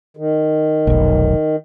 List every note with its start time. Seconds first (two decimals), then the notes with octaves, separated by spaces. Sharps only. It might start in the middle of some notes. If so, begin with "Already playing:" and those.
0.17 D#3
0.87 F1 B1